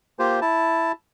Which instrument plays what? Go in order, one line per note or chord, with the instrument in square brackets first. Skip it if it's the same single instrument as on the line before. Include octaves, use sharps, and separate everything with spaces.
[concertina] A#3 F4 G4 C5
E4 A5